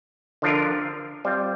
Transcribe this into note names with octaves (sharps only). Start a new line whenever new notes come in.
D3 F3 D4 F4 A#4
G3 C4 F4